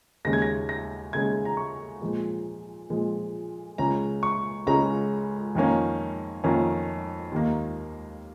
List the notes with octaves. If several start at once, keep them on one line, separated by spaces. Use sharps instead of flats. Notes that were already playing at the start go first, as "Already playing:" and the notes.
D#2 C#3 G#3 C#4 A#6
G#6
A#6
A#6
D#2 C#3 G#3 C#4 G#6
A#5
C#6
A#2 F3 G#3
A#2 F3 G#3
C#2 C#3 G#3 C#4 A#5
C#6
C#2 C#3 G#3 C#4 A#5
F2 D#3 A#3 C#4
F2 D#3 A#3 C#4
D#2 D#3 A#3